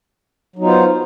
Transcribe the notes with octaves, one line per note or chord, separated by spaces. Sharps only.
F#3 B3 D#4 F4 C5